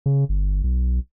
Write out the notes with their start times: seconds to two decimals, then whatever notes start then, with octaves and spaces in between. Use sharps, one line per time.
0.06 C#3
0.29 G1
0.64 B1